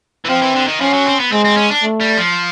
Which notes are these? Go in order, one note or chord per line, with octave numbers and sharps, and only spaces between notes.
E3
F3 C4
E3
D3
D#3
F3 C#4
F#3
C4
B3
G#3 C4
C4
C#4
D4
A3
G3
F3